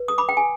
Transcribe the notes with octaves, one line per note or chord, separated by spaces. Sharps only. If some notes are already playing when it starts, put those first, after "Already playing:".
Already playing: B4
D#6
B5 D6
G5
G#5